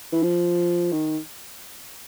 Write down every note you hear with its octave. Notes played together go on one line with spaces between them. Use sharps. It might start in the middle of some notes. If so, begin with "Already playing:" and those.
E3
F3
D#3